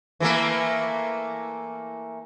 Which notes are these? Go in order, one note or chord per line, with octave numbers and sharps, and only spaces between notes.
E3 A3 A#3